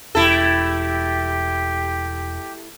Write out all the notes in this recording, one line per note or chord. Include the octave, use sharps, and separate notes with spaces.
E1 A3 E4 G4 A4